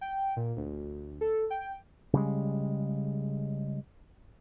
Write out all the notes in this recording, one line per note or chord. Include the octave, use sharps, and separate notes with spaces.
G5
A#2
D2
A4
G5
C#3 G3 G#3